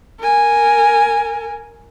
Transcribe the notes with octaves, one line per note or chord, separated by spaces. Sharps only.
A#4 G#5